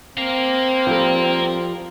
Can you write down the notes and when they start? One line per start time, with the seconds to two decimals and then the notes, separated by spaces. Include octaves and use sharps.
0.17 C4 A#4 F5
0.87 F3 G3 A4